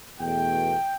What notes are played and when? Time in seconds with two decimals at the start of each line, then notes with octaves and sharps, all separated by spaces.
0.20 E2 B2 A3 G5